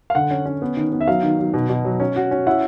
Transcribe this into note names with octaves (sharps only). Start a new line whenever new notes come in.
F5
D3 F#5
C#4
C#4
B3
D#3
B3
E5
F#3 F5
D#3
F#3
B2
B2
F#3
C#4
F#4
C#4
E4 F#5